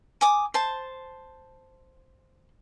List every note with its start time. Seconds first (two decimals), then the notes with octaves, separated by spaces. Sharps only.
0.21 G#5 D6 D#6
0.54 C5 A5